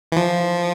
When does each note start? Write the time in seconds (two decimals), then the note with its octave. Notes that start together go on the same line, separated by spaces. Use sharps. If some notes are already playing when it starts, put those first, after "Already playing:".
0.12 E3
0.16 F3